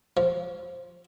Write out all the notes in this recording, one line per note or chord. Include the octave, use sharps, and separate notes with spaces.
F3